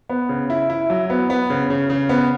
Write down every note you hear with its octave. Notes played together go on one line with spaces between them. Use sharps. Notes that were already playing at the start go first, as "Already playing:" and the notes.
B3
C#3
E4
E4
F#3
B3
B3
C#3
C#3
C#3
B3